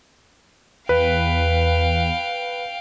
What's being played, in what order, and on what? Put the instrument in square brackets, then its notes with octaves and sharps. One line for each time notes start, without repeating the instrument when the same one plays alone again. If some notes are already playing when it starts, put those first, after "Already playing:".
[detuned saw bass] E2 [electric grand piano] B4 [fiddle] F5 G5